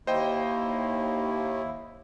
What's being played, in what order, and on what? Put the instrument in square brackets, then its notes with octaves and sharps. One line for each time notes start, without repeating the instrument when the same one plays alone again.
[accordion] D#2 [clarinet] A#3 [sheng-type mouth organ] E4 [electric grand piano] C5 D#5 G5